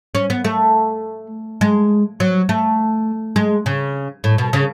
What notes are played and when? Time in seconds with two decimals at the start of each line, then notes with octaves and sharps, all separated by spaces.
0.15 C#4
0.30 B3
0.45 A3
1.61 G#3
2.20 F#3
2.49 A3
3.36 G#3
3.66 C#3
4.24 A2
4.38 B2
4.53 C#3